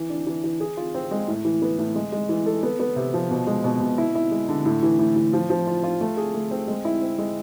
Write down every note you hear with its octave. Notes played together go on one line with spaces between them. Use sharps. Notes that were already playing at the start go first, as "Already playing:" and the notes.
Already playing: E3
D4
E3
E3
G#4
F4
C4
G#3
A2
E3
B3
A2
G#3
G#3
E3
A4
B3
B3
C3
F3
B2
G#3
B2
B2
E4
E4
G#3
D3
A2
E3
A2
A2
F3
F3
F4
F4
A3
G#4
A3
C4
G#3
E4
C4
G#3